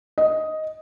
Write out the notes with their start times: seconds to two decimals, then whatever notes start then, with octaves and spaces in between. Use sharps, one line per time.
0.18 D#5